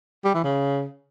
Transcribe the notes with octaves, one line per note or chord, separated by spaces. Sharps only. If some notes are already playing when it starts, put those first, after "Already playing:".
G3
E3
C#3